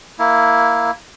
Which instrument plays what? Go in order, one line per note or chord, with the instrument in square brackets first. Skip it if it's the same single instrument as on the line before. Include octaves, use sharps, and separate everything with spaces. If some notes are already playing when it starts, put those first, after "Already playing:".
[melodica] A#3 E4